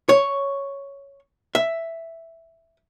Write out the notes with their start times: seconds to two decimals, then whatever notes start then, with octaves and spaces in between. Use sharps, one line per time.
0.09 C#5
1.55 E5